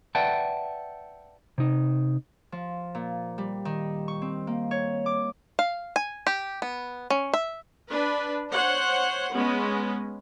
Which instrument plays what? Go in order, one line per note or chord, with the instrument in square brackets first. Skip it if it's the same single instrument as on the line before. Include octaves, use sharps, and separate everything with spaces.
[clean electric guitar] B4 D5 E5 F#5 G5 A5
C3 D#4
[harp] F3
A#2
G3
D#3
C#6
C4
A#3
C#5
D6
[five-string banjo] F5
G#5
G4
B3
C#4
E5
[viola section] D4 B4
C5 C#5 F#5
G#3 B3 C#4